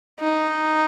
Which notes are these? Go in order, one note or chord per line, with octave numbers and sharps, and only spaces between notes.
D#4